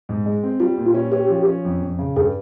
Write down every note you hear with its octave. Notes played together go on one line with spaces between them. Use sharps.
G#2
G#3
C4
G3 F4
A#2
F4
C#4
C#4 G4
F3
C#4
F2
F2
C#3
G2 G#4